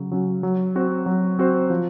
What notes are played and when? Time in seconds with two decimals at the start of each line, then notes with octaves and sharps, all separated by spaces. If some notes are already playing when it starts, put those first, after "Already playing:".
Already playing: C#3 F#3
0.12 F#3 C#4 F#4
0.43 F#3
0.75 C4 F#4 C5
1.06 F#3
1.39 C4 F#4 C5
1.70 F3